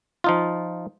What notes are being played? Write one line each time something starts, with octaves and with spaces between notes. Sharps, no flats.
F3 D#4 F4